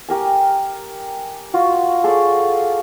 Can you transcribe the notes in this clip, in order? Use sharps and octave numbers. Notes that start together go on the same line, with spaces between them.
G4 A#4 G#5
F4 F#4
G#4 A4 C#5 D5